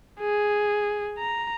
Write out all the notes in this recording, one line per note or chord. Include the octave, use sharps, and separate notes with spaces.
G#4
A#5